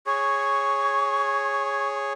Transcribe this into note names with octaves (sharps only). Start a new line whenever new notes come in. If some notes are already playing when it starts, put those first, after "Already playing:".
G#4 C#5 C#6